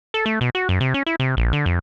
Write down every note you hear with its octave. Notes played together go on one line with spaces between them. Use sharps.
A4
A3
B2
F#4
F#2
C3
C#4
E4
C3
A#1
D3
F2